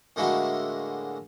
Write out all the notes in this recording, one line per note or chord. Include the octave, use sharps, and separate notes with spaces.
A2 D3 G#3 A#3 E4 F#4